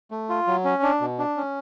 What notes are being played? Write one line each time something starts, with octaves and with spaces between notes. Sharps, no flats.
A3
F4
F#3
C#4
D4
B2
D4
C#4